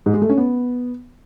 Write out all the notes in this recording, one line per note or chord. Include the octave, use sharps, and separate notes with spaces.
G#2
G#3
A3
C#4
B3